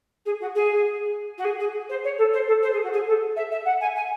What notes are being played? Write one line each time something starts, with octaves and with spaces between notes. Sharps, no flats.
G#4
F#4
G#4
F#4
G#4
G#4
C5
C#5
A4
C5
A4
C5
G#4
F#4
G#4
A4
E5
E5
F#5
G#5
G#5